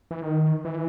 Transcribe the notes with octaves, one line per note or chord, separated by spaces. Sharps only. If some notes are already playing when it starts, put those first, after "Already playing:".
E3
D#3
E3